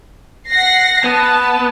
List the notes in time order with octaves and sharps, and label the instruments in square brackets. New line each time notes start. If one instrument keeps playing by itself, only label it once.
[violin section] F#5 A#6 C7
[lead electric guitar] B3 [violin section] A5